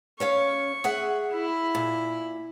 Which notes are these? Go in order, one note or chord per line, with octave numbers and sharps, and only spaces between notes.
C#4 C#5 F5 C#6
G#4 E5 F#5
E4 B5
A#2